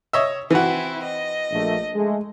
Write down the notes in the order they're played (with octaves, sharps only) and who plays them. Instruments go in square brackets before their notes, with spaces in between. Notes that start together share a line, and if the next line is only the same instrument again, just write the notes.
[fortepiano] C#5 D#5 E5
[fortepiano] E3 F#4 [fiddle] C4 E4
[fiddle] D#5
[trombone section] A#1 A3
G#3 A3